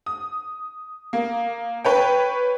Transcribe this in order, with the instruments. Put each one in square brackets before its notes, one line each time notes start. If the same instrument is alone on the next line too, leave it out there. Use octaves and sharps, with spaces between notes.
[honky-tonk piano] D#6
A#3
B4 C#5 G5